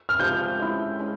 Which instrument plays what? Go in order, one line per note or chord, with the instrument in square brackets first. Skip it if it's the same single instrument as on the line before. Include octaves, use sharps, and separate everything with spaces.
[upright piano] F6
[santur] F3 G#3 C4 G4 [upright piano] G6
[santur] G#3 C#4 E4
G#3 C#4